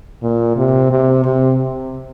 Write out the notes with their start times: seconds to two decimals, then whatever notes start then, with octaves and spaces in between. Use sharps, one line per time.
0.22 A#2
0.57 C3
0.91 C3
1.24 C3